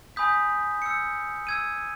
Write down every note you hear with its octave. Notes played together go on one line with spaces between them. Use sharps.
G#5 B5 D#6 G6 B6
E6 G6 C#7
E6 G#6 D#7